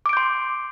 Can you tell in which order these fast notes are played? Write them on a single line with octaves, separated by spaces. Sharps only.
D6 D7 G6 C6